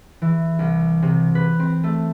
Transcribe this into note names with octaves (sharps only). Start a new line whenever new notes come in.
E3
C2
C3
B4
C4
A3